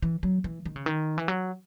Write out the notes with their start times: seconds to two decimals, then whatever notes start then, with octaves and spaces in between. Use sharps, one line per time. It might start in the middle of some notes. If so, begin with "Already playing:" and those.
0.02 E3
0.23 F#3
0.44 E3
0.65 D#3
0.76 C#3
0.86 D#3
1.18 E3
1.28 F#3